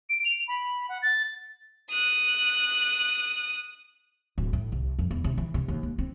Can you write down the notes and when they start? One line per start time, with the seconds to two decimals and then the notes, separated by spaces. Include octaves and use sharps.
0.10 D7
0.25 F7
0.48 B5
0.89 F#5
1.02 A6
1.91 D#6 F#6
4.38 D1
4.53 A2
4.72 C2
4.99 F2
5.11 E2
5.24 C3
5.37 E3
5.54 C3
5.68 D#2
5.83 A#3
5.98 C4